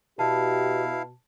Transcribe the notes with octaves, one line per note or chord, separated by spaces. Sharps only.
B2 E4 G4 F5 A5